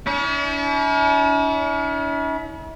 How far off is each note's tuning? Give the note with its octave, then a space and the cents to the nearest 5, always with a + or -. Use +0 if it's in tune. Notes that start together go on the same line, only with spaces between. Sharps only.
C#4 +45 E4 -40